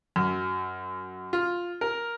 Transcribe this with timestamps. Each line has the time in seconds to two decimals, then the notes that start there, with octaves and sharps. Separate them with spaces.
0.16 F#2
1.33 F4
1.81 A#4